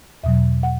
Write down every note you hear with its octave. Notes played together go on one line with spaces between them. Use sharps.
E2 B2 F#3 E5
F#5